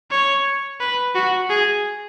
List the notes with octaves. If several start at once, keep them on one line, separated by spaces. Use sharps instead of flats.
C#5
B4
F#4
G#4